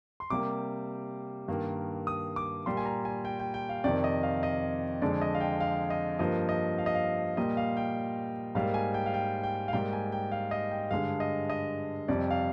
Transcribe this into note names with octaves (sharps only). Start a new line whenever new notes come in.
C6
C3 G3 A#3 D6
G2 D#3 A#3
D#6
D6
A#2 G3 A#3 C6
G#5
A#5
G#5
G5
G5
G5
F5
F2 C3 D#3 D5
D#5
F5
D#5
F2 D3 G#3 D5
D#5
F5
G5
F5
D#5
G2 F3 A#3 D#5
D#5
F5
D#5
F5
A#2 G3 A#3 D#5
F5
G5
G#2 G3 A#3 F5
G#5
G5
F5
G5
G5
F5
G#2 G3 A#3 G5
G#5
G5
F5
D#5
G5
G2 D3 G#3 F5
D#5
D#5
F2 C3 G3 D5
F5